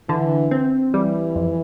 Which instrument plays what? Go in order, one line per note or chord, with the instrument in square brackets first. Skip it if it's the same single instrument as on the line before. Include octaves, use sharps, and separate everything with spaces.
[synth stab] D3 [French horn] E3
[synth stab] C4
[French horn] E3 [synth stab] G3
[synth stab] F2